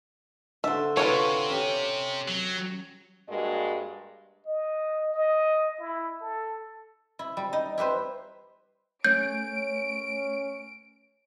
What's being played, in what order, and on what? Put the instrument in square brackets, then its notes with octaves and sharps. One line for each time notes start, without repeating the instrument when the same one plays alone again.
[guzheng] D3 C5 [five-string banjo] E5
[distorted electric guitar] C3 [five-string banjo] F4 B4 C#5
[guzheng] C#4 G4
[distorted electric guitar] F#3
[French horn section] G2 G#3 A#3 F#4 D5
[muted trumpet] D#5
D#5
E4
A4
[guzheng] E4
G3
D#4
E4 G4 B4 C5
[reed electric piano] A3 [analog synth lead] C#4 [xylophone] G6 [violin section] D7